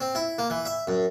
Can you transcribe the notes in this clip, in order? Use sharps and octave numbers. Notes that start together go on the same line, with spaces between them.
C4
E4
A#3
E3
E5
F#2